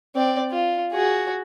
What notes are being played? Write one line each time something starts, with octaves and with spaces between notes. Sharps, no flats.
C4 D5
F4
F#4 G#4